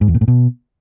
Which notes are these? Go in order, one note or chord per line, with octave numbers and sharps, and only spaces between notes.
G#2
E2
A#2
A2
B2